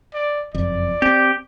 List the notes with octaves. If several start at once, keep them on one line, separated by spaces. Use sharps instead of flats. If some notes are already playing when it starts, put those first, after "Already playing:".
D5
F#1 F2 D5
C4 G4